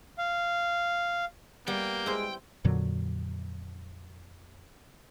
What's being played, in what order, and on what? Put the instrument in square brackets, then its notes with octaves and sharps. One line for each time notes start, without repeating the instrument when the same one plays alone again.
[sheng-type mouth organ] F5
[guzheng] G3 B3 [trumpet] A#3 [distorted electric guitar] G5
[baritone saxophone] G#3 [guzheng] E4 C5
[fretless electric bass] F2 A#2 D3 F#3